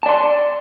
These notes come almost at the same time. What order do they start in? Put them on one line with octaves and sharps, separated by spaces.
A5 D5 C6